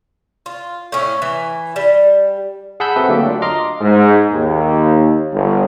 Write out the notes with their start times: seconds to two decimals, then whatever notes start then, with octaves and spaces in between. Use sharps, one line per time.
0.46 F4
0.92 A2 C#4
1.22 E3
1.76 G3
2.80 G#4 F#5 A5 B5 E6 G6
2.96 C4 F#4 A4 B4 E5
3.09 D3 F#3 A3 A#3 G4
3.25 D4 F4
3.42 D#5 A#5 C6 D6 F6
3.80 G#2
4.31 D#2
5.32 G1